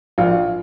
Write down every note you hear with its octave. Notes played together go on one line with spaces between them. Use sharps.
A#1 F4